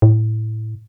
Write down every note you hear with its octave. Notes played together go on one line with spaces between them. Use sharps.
A2